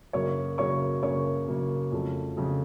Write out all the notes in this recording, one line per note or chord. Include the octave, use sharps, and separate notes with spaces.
F#2 C#3 F#3 A#3 C#5 C#6
F#2 C#3 F#3 A#3 C#5 C#6
F#2 C#3 F#3 A#3 C#5 C#6
F#2 C#3 F#3 A#3
F2 C#3 F#3 A3
F2 C#3 F#3 A3